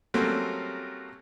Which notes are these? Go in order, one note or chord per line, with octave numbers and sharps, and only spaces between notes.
F#3 G3 A3 A#3 C4 C#4